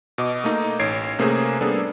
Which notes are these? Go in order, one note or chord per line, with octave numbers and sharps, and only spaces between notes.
B2 D#5 D6
A3 A#3 D#4
A1 C#5 G#6 C7 D7
C3 A3 A#3 C#4 G#4 C5
G3 A#3 B3 D4 G#4 A4